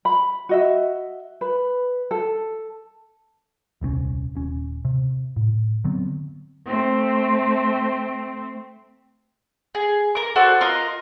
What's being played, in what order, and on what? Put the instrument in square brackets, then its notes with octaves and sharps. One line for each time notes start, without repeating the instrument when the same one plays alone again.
[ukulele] B5
F#4 D#5 E5
B4
A4
[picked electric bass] D#1 C2 C4 C#4
D#1 C#4
C3
A2
D3 F#3 B3 C4
[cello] A3 C4
[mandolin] G#4
A#4 D6
F#4 A4 C5 D5
F4 A#4 D#5